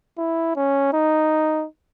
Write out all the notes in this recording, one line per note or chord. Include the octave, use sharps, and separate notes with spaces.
E4
C#4
D#4